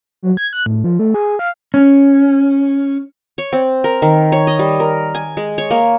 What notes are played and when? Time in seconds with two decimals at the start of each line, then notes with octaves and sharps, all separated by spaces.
0.23 F#3
0.37 G#6
0.53 F#6
0.66 A2
0.84 F3
0.99 A3
1.14 G#4
1.39 F5
1.74 C#4
3.38 C#5
3.53 C4
3.84 A#4
4.02 D#3
4.32 C#5
4.47 D#5
4.59 G3
4.80 A#4
5.15 G#5
5.37 G#3
5.58 C#5
5.70 A#3